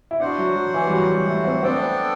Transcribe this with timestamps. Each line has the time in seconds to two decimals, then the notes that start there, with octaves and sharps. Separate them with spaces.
0.11 E4
0.20 D4 F#4 C5 F#5
0.38 F#3
0.56 F#3
0.74 E3
0.87 G3
0.92 F#3
1.10 G3
1.27 A3
1.45 C4
1.63 B3 C4 D4 A4 D5 G5